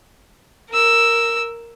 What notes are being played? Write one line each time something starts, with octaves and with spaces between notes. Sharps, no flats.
A#4 E6